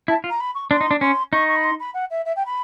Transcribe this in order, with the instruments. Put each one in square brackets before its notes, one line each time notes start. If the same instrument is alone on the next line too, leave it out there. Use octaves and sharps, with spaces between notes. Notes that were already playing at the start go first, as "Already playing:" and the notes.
[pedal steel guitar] E4 [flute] A5
[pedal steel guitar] F4
[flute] A#5
B5
C#6
[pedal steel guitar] D4 [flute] C6
[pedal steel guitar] D#4
D4
[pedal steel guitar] C#4 [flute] C6
[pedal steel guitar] D#4 [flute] C#6
[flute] C#6
B5
C6
B5
F#5
E5
E5
G5
B5